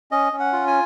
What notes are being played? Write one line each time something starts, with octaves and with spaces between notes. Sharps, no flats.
C#4 D#5
C#4
F#5
F4
G#5